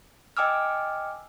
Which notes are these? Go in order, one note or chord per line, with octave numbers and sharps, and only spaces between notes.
D#5 G5 G#5 D6 E6 F6